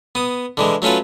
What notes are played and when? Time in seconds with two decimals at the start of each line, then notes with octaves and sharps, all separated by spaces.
0.15 B3 D#6
0.57 D3 E3 G#3
0.82 F#3 A3 C#4 F4 B4